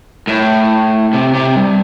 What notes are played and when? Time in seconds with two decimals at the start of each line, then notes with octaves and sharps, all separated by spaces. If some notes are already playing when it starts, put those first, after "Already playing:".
0.27 A2
1.13 C3
1.34 C3
1.55 G2